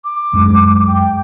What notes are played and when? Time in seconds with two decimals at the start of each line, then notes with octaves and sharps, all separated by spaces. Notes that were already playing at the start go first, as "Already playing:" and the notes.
0.04 D6
0.34 F#2 G#3
0.87 G5